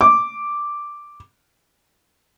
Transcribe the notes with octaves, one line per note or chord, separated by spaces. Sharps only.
D6